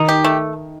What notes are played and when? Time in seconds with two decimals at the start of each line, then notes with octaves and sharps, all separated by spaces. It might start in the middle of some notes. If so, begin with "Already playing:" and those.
Already playing: D#3 D#4
0.09 G4
0.24 A3